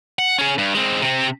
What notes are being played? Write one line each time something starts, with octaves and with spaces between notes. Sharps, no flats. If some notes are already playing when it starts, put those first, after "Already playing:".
F#5
C#4 G#4
G2
G#3 C4
C3 C4